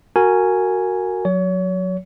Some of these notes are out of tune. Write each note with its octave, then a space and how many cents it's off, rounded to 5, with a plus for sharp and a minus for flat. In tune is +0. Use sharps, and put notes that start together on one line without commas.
F#4 +0 A#4 -15 G#5 +0
F#3 -20 C#5 +35